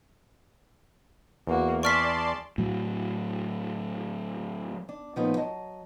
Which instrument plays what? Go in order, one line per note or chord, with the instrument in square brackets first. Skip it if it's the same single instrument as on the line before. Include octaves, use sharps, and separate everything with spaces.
[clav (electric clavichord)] E2 [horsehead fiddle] A#3 F#4
[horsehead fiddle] G#4 [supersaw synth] D5 A5 C6 [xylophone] C#6 F6 B6
[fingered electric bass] A2 F#3
[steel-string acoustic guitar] D4
A#2 F3 A3 B3 C#4 D#4
F#3 D#5 A5